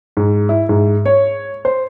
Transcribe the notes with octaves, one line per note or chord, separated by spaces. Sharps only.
G#2
E4
G#2
C#5
C5